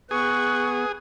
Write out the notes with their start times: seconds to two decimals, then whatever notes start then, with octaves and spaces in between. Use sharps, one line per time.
0.11 B3 G#4 C#6 F#6